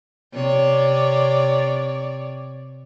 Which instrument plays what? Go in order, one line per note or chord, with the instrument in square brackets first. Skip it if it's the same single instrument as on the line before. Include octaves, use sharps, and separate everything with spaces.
[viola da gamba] C3 C#5 D5